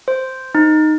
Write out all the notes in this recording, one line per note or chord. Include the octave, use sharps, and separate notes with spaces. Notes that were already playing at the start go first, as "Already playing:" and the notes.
C5
D#4